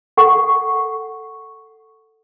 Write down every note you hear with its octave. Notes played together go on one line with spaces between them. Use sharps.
A4 F#5 C#6